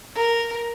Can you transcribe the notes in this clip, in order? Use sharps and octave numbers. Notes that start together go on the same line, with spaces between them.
A#4